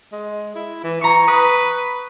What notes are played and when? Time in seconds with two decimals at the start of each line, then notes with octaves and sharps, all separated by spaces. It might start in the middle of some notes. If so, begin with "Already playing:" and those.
0.13 G#3
0.55 E4
0.84 E3
1.01 E3 A#5 C#6
1.28 B4 D#6